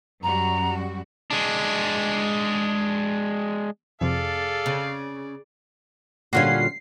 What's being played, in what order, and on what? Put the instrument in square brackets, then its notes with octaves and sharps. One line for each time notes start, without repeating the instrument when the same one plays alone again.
[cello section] F#2 G3 F#4 [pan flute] A#5
[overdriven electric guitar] G#3 D4
[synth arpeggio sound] F2 C3 [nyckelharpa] G#4 D5 [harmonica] A4 F5
[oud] C#3
[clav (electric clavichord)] A#2 D3 G3 [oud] C#4 F4 F#4 [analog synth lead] C7